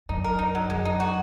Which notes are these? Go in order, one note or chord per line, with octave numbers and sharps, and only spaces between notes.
F#2 D#4
A#4
D#4
F#3
F#2 G#3
D#4
F#4